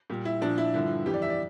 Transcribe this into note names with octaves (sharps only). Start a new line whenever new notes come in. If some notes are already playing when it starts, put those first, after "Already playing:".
A#2 G3
E4
A#2 F3 D4
E4
G2 D3 F3 E4
F2 E3 G3 G4
D5
E5
D5